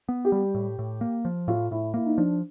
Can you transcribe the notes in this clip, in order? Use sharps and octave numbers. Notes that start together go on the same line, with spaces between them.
B3
G4
G3
A2
A2
A#3
F3
A2 F4
A2 E4
A#3 E4
D#4
F3 D4